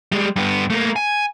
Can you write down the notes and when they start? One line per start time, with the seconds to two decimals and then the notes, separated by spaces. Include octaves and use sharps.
0.12 G3 G#3
0.36 G2 B3
0.70 A3 A#3
0.96 G#5